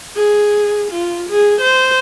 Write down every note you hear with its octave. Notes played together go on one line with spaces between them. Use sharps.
G#4
F4
G#4
C5